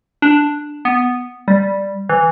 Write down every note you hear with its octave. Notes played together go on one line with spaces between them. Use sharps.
D4
B3
G3
E3